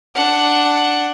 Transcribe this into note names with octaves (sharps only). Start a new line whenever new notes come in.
D4 F#5